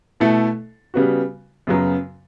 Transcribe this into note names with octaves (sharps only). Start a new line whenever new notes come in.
B2 A3 E4 A4
C#3 G3 B3 F#4
F#2 C#3 F#3 B3